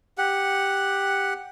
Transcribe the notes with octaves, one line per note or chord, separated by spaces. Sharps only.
G4 F#5